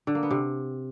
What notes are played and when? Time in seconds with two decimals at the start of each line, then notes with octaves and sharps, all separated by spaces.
0.07 D3
0.15 A#3
0.23 B3
0.31 C3